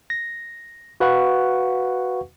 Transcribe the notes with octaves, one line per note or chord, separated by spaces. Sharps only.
A#6
F#4 B4 F5 F#5 C#6